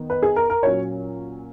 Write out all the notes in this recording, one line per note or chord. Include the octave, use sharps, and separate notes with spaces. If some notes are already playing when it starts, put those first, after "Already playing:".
Already playing: D#3 B3 D#4
B4
G#4
A#4
A#4
A#2 F#3 C#4 C#5